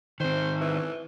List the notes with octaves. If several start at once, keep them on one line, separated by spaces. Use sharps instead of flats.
D#3 C4 C5
E3